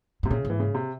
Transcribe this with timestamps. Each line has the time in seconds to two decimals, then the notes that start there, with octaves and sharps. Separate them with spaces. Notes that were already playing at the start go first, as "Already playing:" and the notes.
0.23 G#2 C3
0.30 A#2 C#3
0.45 G#2
0.50 E3
0.59 C#3
0.75 C3